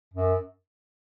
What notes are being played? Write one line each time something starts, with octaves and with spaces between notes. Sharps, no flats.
F#2